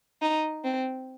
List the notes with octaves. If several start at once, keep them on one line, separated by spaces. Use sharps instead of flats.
D#4
C4